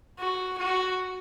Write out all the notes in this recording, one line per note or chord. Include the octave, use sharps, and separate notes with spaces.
F#4
F#4